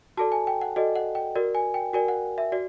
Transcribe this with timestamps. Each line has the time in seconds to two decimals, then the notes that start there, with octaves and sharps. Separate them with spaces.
0.17 F#4 A4 D5 A5
0.32 G#5
0.47 G5
0.61 F#5
0.76 F#4 A4 D5 D#5
0.96 F#5
1.15 G5
1.35 F#4 A#4 D5
1.55 G#5
1.74 G5
1.93 F#4 A#4 D5 G#5
2.08 F#5
2.38 E5
2.52 F#4 D5